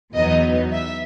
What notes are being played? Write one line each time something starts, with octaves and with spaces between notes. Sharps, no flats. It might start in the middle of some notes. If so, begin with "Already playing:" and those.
E2 B2 F#3 B3 D#4 D#5
E5